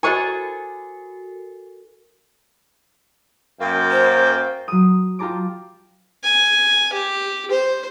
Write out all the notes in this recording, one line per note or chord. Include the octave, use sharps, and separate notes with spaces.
E4 F#4 A4 A#4 C5 D#5 G#5 C#6
F#2 A#3 G5
C5
F#3 D#6
F4 G4 A5 A#5 D6
G#5
G4
C5